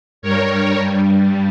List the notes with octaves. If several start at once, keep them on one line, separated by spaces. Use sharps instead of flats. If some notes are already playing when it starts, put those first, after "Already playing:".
G2 G3 A#4 C#5